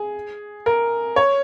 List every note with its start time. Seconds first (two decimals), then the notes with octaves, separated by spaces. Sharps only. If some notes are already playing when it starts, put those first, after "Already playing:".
Already playing: G#4
0.66 A#4
1.16 C#5